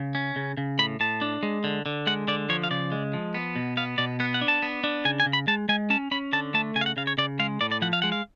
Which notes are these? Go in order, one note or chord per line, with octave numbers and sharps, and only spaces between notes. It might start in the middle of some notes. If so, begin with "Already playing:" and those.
Already playing: C#3
C#4
C#3
C#3
A2 B5
A2 A5
D4
G#3
D3
D3
G#3 F#5
D3 D5
F3 C#5
F5
C#3 D5
G#3
F3
B3
B2
B3 F5
B2 D5
B3 F#5
F#5
D4
A5
B3
D4
C#3 G#5
G#5
C#3
B5
G#3 A5
G#3 G#5
C#4 A5
C#4 B5
D3 A5
A3 A5
C#3 G#5
F5
F#5
C#3 F5
C#5
C#3 D5
G#3 F5
A2 D5
D5
F3 F#5
F5
G#3 F#5
F5